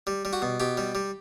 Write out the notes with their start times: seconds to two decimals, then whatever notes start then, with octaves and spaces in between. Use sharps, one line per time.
0.07 G3
0.25 G3
0.33 F#4
0.42 B2
0.60 B2 G4
0.77 G3
0.95 G3